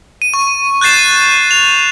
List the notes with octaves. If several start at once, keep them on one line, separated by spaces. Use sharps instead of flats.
D#7
C#6
F#6 G6 A6 C7 E7
D#7
F7